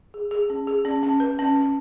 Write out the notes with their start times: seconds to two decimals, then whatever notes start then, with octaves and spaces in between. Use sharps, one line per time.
0.14 G#4
0.31 G#4
0.50 C#4
0.67 G#4
0.85 C#4
1.03 C#4
1.20 B4
1.39 C#4
1.56 C#4